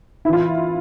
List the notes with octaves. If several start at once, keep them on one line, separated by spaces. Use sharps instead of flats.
E4
E3 F4